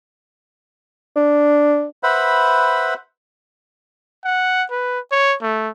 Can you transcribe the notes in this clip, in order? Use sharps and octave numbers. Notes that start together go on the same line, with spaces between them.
D4
B4 C5 E5 F#5 B5
F#5
B4
C#5
A3